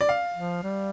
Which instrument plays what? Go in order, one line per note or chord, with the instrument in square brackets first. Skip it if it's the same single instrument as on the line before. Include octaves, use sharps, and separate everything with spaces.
[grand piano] D5
F5
[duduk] F3
G3